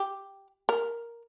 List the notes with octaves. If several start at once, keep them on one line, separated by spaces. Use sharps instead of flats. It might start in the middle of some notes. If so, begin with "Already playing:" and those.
Already playing: G4
A#4